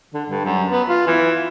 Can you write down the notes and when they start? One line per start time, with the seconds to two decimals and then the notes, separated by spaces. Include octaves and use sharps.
0.14 D3
0.29 G2
0.45 F#2
0.71 B3
0.88 F4
1.07 E3